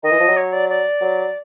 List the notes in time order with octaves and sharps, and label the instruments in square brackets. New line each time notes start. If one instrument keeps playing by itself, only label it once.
[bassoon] D#3 [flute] D#5
[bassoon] E3
F3
F#3
[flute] C#5
D5
D5
[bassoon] F#3